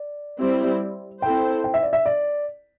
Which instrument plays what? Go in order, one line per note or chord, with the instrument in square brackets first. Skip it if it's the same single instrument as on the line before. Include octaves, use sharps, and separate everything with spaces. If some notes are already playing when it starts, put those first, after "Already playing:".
Already playing: [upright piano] D5
[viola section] G3 C4 E4
[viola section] C4 E4 A4 C5 [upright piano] G5
[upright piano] G5
E5
D5
E5
D5